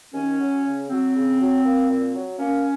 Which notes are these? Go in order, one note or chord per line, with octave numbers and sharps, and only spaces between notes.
D#2 C#4
F#3
C#3
F#3 C4
C#3
F#3
A#3
A#2
F#3
A#3 C#4